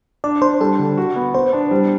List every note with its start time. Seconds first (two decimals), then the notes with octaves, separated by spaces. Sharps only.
0.24 D4 D5
0.42 D4 C5
0.60 G3 A4
0.78 D3
0.97 F#4
1.16 B3
1.34 B3 C5
1.53 D4
1.71 G3